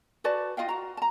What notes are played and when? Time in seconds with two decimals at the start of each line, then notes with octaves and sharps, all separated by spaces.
0.24 F#4 B4 D5 A5
0.57 F4 D#5 F5 G5
0.69 F#4 A#5
0.97 A5 A#5